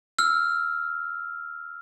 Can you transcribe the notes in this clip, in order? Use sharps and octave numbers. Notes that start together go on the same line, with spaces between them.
E6 F6